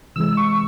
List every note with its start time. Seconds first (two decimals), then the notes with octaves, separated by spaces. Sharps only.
0.16 C3 E3 G#3 E6
0.37 C#6